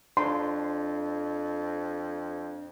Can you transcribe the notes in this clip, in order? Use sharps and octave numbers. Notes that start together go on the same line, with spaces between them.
F2 D4 C6